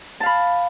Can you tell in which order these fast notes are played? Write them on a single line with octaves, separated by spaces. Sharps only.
A5 F5 B5